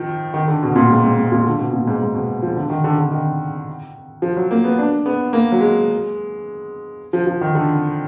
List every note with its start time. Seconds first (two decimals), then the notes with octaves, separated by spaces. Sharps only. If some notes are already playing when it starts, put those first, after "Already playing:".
Already playing: D#3 F3
0.34 D#3
0.48 D3
0.63 B2
0.76 A#2
0.90 G#2
1.03 G#2
1.17 G#2
1.32 A#2
1.46 D3
1.59 B2
1.73 A#2
1.87 G#2
2.01 G#2
2.14 B2
2.42 F3
2.57 D3
2.70 D#3
2.84 D3
2.98 D3
3.12 D#3
4.22 F3
4.37 F#3
4.51 A#3
4.64 B3
4.78 D4
5.06 B3
5.33 A#3
5.52 F#3
5.61 G#3
7.13 F3
7.27 F3
7.41 D#3
7.55 D3